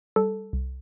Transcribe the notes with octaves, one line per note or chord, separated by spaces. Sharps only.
G3 A4
C2